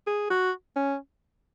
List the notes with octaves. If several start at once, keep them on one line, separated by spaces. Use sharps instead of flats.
G#4
F#4
C#4